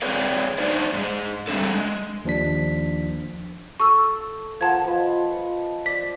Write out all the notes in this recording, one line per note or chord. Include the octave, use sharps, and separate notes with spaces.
G#3 C4 G#4 B4 C#5 D5
D4 D#4 C5 D5
G#2 G#3
G3 A3 C4 D4 A4
G#3
D#2 F3 D4 B6
A4 C#6 E6
F3 A#4 F#5 G#5 A5 G#6
F3 B4 D#5
C#6
D5 B6